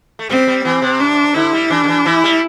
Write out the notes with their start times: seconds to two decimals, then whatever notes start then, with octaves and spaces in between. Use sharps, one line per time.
0.19 A3
0.30 G3 C4
0.47 G3
0.64 E3 C4
0.82 C3
1.00 D4
1.35 D3 E4
1.53 G3
1.70 E3 D4
1.84 D3
1.88 E3
2.05 E3 E4
2.24 G3